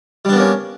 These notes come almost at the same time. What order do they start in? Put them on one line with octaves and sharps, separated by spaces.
G3 D4 B3 A#3 C#4